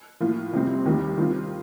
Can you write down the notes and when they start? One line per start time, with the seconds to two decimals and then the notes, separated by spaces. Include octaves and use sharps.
0.20 A2 F3 A#3 F4
0.53 F2 C3 G3 C4
0.85 D#2 D#3 G3
1.17 D#3 G3 C4 F4